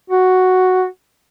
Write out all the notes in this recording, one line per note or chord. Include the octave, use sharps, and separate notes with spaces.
F#4